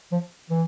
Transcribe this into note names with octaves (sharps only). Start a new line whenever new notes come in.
F3
E3